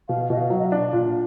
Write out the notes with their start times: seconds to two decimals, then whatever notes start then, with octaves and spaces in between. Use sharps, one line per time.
0.08 B2 F5
0.30 B2 D#5
0.37 F5
0.50 F#3
0.59 D#5
0.64 F5
0.72 D4
0.93 A#2